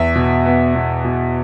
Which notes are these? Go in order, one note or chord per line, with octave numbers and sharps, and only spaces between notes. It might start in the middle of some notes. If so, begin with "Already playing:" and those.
Already playing: E2 E5
B2
B3
B2
B2